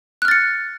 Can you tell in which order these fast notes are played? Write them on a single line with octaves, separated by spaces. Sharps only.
F#6 F6 A6 C#7